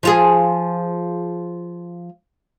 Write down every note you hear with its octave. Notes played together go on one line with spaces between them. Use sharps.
F3 F4 G#4